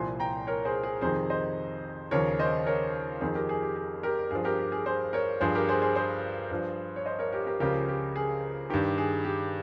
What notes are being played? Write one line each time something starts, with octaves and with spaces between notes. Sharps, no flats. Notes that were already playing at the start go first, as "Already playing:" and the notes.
Already playing: C2 A#2 F3 G#5 C6
G5 A#5
A#4 C#5
G#4 C5
G#4
F2 C3 D#3 G#4 C5
C5 D#5
D#2 C#3 F3 A#4 C#5
C5 D#5
A#4 C#5
F2 D#3 G#4 C5
G4 A#4
G#4
G4
G#4
G4 A#4
G2 F3 G#4
G4 A#4
G4
G#4
G#4 C5
A#4 C#5
G2 F3 G#4 C5
G4 A#4
G#4 C5
G#4 C5
G#4 C5
G2 F3
C#5
C5 D#5
A#4 C#5
G4 A#4
G4 A#4
C#2 C#3 F3 G4 A#4
G4
G#4
G2 D#3 G4
G#4
G4